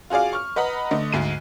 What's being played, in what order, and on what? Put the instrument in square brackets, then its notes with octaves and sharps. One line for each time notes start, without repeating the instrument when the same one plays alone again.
[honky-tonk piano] F4 F#4 G#4 D5 F5
C#6 F6
B4 D#5 F#5 A#5 B5
D3 A3 D#5
D2 G#2 C7 D#7